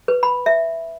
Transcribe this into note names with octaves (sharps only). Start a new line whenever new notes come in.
B4
B5
E5